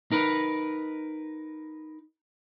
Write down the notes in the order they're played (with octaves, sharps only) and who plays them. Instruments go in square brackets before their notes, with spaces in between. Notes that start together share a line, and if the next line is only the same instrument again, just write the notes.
[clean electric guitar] D#4 A#4 B4